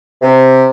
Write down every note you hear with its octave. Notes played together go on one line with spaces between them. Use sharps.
C3